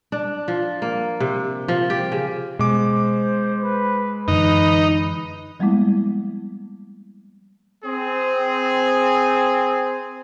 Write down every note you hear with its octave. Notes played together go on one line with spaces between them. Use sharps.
D4
F3
A#3
C3
F3
G4
C#3
B2 G#3 C5 D6
B4
F#2 D3 E3 D#4 B4
F3 G3 G#3 A#3 B3 E4
C4 G#4